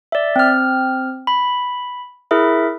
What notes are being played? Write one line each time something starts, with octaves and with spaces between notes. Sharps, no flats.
D5 E5
C4 F6
B5
E4 G#4 A#4 E5